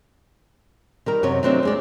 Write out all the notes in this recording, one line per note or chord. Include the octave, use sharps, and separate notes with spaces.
D#3 G3 A#4
F#2 C3 C#5 D#5
F#3 A3 C4 D4 D#4 G4
D#2 G#3 D5